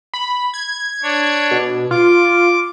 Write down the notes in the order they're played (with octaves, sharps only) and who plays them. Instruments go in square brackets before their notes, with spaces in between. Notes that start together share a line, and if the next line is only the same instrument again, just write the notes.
[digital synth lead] B5
G#6
[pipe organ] D4 C#5
[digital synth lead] B2
[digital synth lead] F4 [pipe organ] D6